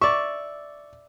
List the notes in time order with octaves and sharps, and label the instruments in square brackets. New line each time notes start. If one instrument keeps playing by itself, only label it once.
[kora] D5 E5 [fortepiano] C#6